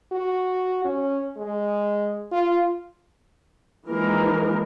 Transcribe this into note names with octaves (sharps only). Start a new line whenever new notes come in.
F#4
C#4
G#3
F4
E3 F3 G#3 A#3 D#4 A#4